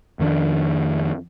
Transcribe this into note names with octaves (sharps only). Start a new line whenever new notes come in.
F2 D#3 C#4 D4